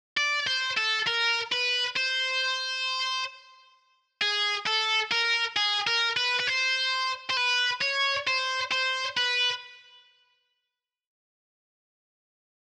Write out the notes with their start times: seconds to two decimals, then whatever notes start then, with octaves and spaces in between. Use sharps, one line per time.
0.17 D5
0.47 C5
0.77 A4
1.07 A#4
1.52 B4
1.97 C5
4.22 G#4
4.67 A4
5.12 A#4
5.57 G#4
5.87 A#4
6.17 B4
6.40 B4
6.47 C5
7.30 C5
7.37 B4
7.81 C#5
8.27 C5
8.72 C5
9.17 B4